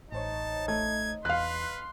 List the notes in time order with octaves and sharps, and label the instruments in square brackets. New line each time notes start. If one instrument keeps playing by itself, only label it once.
[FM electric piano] A1 C5 C#5 [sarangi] D#4 [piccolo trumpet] A5
[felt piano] A3 [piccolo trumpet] G#6
[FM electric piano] E2 [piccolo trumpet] B4 [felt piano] F5 F#6 [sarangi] C6